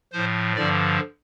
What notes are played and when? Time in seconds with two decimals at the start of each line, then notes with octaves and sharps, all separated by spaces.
0.12 A2 F3 C5
0.56 G2 D3 F3 D5